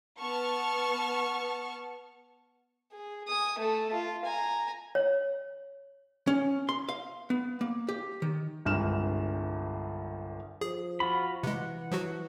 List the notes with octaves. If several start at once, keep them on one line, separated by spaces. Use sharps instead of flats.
B3 A5 C#6 F6
G#4
G#5 D#6
A3 A4
F4
G#5 A#5
C#5
C#4
C6
F5
B3
A#3
G4
D#3
G1 C2 G2 G#3 F6 E7
F3 G#4
F4 F#4 B5
C3 E3 G#3 F#5
F3 F#3 F#4